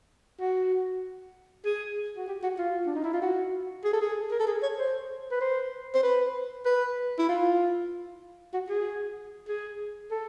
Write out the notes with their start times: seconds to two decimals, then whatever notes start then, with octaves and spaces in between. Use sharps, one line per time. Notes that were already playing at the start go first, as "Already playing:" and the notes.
0.41 F#4
1.65 G#4
2.17 F#4
2.28 G4
2.43 F#4
2.59 F4
2.86 D4
2.95 D#4
3.04 E4
3.13 F4
3.22 F#4
3.85 G#4
3.93 A4
4.01 G#4
4.31 A#4
4.40 A4
4.47 G#4
4.62 C#5
4.78 C5
5.31 B4
5.41 C5
5.94 C5
6.03 B4
6.65 B4
7.19 E4
7.29 F4
8.53 F#4
8.69 G#4
9.48 G#4
10.11 A4